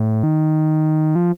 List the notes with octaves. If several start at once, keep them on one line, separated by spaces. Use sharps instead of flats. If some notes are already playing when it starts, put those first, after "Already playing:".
Already playing: A2
D#3
F3